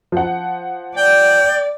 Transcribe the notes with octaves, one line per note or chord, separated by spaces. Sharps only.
F3 F#5
D5 G5